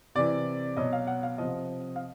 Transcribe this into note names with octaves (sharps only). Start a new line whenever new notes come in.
C3 E3 D5
B2 F#3 D#5
F5
F#5
F5
C3 F3 D#5
F5